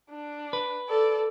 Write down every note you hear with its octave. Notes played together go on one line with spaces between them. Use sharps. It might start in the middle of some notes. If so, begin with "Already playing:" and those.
D4
B4
A4 D5